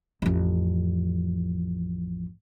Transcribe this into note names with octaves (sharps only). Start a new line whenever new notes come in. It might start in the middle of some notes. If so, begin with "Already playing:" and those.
A1 F2